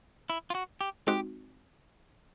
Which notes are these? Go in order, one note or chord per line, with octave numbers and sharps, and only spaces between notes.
E4
F4
F#4
G4
G#3 C4 D#4 F#4 G4